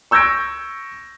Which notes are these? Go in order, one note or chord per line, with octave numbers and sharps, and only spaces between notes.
C#6 E6 G6 G#6 A#6 D7